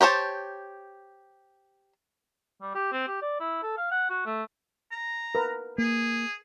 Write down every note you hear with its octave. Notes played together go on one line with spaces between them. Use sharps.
G4 C5 C#5 A5
G3
G4
C4
G4
D5
E4
A4
F5
F#5
F#4
A3
A#5
A#4 B4
A#3 G#4